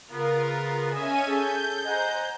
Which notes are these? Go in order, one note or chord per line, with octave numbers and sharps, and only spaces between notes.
C#3 B3 F4 A#4
C#4 D#5 E5 G#5 D#7
G#4 A4 G6
C5 D#5 F#5 G#5 A#5